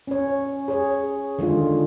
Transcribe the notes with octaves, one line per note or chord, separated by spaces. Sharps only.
C#4 C#5
G#4 C#5
D3 D#3 G#3 F4